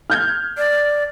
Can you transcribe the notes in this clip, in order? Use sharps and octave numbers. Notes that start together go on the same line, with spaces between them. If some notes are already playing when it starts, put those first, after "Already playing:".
F6 G6 G#6
D5